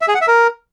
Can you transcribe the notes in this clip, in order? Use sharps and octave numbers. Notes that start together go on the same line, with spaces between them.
E5
G#4
F#5
E5
A#4